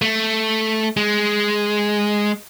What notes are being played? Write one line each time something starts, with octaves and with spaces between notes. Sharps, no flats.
A3
G#3